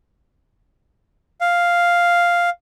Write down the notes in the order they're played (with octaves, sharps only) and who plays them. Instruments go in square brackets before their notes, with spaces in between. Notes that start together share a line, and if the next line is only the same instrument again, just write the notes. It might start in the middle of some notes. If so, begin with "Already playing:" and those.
[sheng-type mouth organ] F5